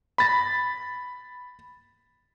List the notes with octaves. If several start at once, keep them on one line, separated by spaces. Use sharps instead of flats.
B5 A6 A#6